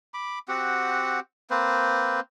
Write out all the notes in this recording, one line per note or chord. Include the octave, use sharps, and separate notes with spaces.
B5 D6
C4 F#4 G4 F#5
A#3 C4 B4 C5